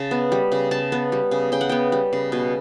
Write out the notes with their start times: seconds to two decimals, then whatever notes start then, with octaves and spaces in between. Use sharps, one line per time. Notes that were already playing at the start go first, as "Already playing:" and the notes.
Already playing: C#3 A5
0.11 B3
0.32 G3
0.52 C#3
0.71 C#3 A5
0.92 B3
1.12 G3
1.31 C#3
1.52 C#3 G5
1.61 F#5
1.69 B3 G5
1.92 G3
2.13 C#3
2.32 B2